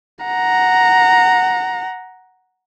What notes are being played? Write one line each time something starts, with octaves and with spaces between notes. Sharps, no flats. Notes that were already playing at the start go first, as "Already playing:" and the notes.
F#5 A#5